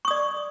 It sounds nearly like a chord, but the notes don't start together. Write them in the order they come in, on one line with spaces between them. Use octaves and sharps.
C#6 D#6 D5